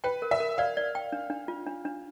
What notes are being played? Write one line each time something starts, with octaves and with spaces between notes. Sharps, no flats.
B4 G5
A#4
E5
A#4
D5 F5
D5
G5
D4
D4
F4
D4
D4